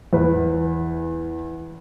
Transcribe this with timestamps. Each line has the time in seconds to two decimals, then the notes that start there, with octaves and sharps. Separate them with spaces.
0.13 E2 B4